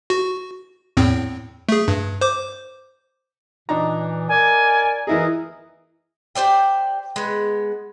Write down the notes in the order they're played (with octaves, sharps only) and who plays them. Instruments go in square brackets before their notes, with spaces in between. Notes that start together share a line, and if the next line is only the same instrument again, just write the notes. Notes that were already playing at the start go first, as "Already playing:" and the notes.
[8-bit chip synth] F#4
E2 A2 C4
A3 G#4
G2
C5 D6
[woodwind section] A#2 E3 [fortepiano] D4 D#4 A#5
[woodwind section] A#4 D5 [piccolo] G#5
[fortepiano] E3 E4 G#4 [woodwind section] A#4 D#5
[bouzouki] G4 C5 D5 G5
G#3 B3